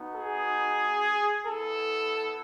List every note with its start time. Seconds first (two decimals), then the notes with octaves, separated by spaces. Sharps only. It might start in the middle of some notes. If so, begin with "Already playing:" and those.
Already playing: B3 D#4 F#4
0.16 G#4
1.45 B3 E4 A4